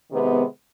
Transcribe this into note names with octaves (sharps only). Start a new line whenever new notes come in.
C3 D#3 G#3 B3